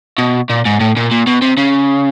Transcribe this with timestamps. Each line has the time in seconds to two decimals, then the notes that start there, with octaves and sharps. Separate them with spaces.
0.18 B2
0.49 A#2
0.65 G#2
0.80 A2
0.96 A#2
1.11 A#2
1.27 B2
1.42 C3
1.57 C#3